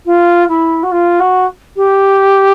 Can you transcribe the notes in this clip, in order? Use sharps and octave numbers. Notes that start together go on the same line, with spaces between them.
F4
E4
F#4
F4
F#4
G4